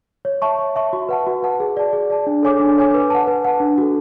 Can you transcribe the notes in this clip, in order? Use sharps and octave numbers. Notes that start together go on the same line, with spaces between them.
C#5
E5 A5 C#6
C#5
E5 A5 C#6
F#4
B4 F#5 A5
F#4
B4 F#5 A5
G#4
D5 A5
G#4
D5 A5
D4
A4 C#5 G#5 D6
D4
A4 C#5 G#5 D6
B4
F#5 A5
B4
F#5 A5
D4
F#4 A4